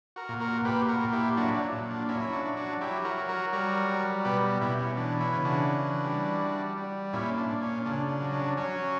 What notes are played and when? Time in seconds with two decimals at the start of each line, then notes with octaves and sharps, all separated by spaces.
0.16 F#4 A#4
0.29 A#2
0.40 F#4 A#4
0.65 A#2 G4 B4
0.89 F#4 A#4
1.01 A#2
1.12 E4 G4
1.37 F#3 D4 F#4
1.49 E4
1.54 D4
1.72 A#2
1.90 D4
2.09 F#3 C#4 E4
2.21 E4
2.32 D4 F#4
2.45 F#3
2.57 D4 F#4
2.81 F#3 E4 G4
3.05 F#4 A#4
3.18 F#3
3.29 F#4 A#4
3.53 G3 F#4 A#4
3.89 G3
4.25 B2 G4 B4
4.61 B2 E4 G4
4.79 C#4
4.97 E3 D4
5.21 C#4 E4
5.33 C#3
5.45 D4 F#4
5.69 E3
6.05 G3
6.41 G3
6.77 G3
7.13 A#2 C#4 E4
7.38 D4
7.49 A#2
7.62 C#4
7.85 C#3 D4
8.09 D4
8.21 F#3
8.33 D4
8.57 F#3 C#4